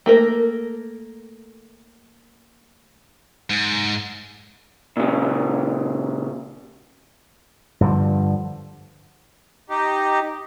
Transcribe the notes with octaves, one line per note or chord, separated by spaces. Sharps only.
A3 A#3 A#4
G#2
A#2 C#3
G2 D3 F3
D#4 G4